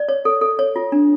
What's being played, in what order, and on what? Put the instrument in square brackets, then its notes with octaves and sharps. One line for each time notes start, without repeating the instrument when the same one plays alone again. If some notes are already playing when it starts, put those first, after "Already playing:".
Already playing: [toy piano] D5
C#5
A4
A4
C#5
F4
D4